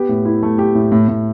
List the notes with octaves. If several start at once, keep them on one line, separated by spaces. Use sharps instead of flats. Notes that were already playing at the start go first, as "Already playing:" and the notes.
Already playing: B3 G4
A2
E4
A3
G4
A2
A2
A2